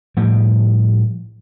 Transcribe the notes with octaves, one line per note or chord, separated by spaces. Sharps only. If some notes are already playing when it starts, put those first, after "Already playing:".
A2 F3 G3